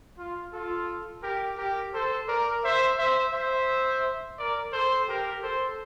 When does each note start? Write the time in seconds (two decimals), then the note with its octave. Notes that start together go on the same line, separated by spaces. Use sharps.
0.18 F4
0.52 F4 A4
1.22 G4 A#4
1.57 G4 A#4
1.93 A4 C5
2.27 A#4 D5
2.63 C5 E5
2.98 C5 E5
3.33 C5 E5
4.37 A#4 D5
4.73 A4 C5
5.08 G4 A#4
5.42 A4 C5